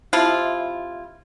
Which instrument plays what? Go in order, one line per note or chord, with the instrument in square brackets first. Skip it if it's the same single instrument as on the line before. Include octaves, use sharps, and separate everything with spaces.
[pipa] C3 F3 E4 F4